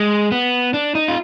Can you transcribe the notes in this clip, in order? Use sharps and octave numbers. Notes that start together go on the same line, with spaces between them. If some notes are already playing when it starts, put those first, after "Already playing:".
Already playing: G#3
B3
D4
D#4
F4